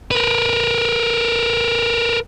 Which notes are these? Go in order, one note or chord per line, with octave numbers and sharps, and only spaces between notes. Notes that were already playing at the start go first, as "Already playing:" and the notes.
A#4 B4